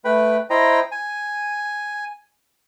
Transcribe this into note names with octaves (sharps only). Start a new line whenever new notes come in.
A3 B4 G5 B5
E4 C5 D#5 G5 A#5
G#5